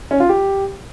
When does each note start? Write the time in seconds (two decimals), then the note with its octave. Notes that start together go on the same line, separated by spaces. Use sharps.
0.11 C#4
0.20 F4
0.29 G4